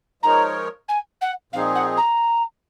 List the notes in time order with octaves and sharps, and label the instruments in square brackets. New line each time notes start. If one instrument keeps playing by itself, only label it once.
[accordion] F3 G#3 D#4 A#4 C#5 [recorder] A#5
[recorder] G#5
F#5
[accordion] A#2 F3 C4 D#4 G#4 [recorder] F5
[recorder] F#5
A#5